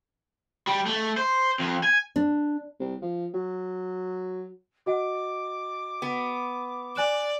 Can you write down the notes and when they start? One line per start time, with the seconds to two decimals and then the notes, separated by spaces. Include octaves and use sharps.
0.67 G3
0.86 A3
1.17 C5
1.59 F2
1.83 G#5
2.16 D4
2.80 C2
3.02 F3
3.34 F#3
4.86 F#4 D#5 F#5 D6
6.02 B3
6.96 D5 G#5 F#6 E7